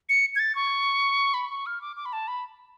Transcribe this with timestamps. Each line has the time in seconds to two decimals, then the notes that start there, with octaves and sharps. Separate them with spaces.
0.09 C#7
0.36 G#6
0.39 A6
0.55 C#6
1.34 B5
1.49 C#6
1.66 F6
1.81 D6
1.96 D6
2.05 B5
2.13 A5
2.28 B5